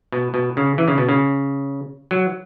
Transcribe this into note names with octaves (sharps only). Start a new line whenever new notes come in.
B2
B2
C#3
E3
C#3
B2
C#3
F#3